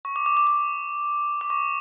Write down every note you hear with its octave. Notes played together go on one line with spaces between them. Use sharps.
C#6
D6
D6
D6
D6
D6
C#6